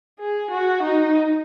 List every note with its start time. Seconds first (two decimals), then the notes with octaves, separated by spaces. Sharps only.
0.20 G#4
0.51 F#4
0.83 D#4